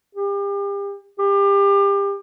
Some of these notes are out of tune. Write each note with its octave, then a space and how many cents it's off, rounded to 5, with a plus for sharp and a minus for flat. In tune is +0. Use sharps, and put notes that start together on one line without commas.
G4 +35
G4 +30